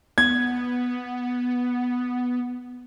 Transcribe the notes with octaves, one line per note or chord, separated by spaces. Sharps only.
B3 G#6